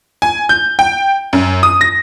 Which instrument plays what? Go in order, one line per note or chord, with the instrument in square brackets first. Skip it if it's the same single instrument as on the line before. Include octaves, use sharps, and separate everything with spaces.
[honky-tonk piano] G#5
G6
G5
F#2
D#6
A#6